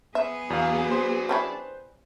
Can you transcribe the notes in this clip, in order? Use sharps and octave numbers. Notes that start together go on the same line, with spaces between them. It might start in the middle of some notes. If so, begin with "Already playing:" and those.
B3 G#4 E5
E2 F#3 D4 F5
B4 C5 C6
G3 C#4 E4